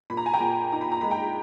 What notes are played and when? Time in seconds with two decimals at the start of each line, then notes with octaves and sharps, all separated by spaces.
0.10 A#2 B5
0.17 A#5
0.26 G#5
0.34 G5 A#5
0.40 A#2
0.72 D#4 A#5
0.81 B5
0.92 A#5
1.01 G#3 B5
1.11 G5 A#5